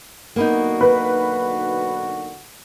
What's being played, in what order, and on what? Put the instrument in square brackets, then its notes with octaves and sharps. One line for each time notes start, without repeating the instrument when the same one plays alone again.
[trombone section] B1 D3 F#4 [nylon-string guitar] A#3 B3 D#4
[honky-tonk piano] B4